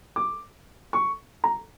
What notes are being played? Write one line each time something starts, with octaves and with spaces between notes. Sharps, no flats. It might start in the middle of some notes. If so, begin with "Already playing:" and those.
D6
C#6
A#5